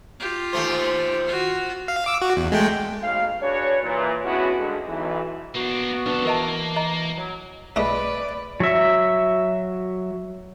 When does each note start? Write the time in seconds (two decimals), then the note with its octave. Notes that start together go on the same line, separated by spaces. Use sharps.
0.20 F4 G4
0.53 D#2 A3 C5
1.26 F4 F#4
1.88 F5
2.06 D6 E6
2.22 F#4
2.37 E2
2.52 G#3 A3 G5
3.03 B1 F5
3.42 D4 F#4 G#4 B4 C#5
3.83 A#2 E3
4.25 G#3 B3 C#4 D4 E4 F#4
4.59 G2 D3 G#3
4.88 B1 E3
5.55 A#3 B3 D4 F#4
6.06 C2 D4 A4 B4
6.25 E3 A#3 A#4 D#5 A5
6.76 D#5 A#5
7.16 F#3
7.76 B1 A#2 G#3 A3 B4 D5
8.60 F#3 E5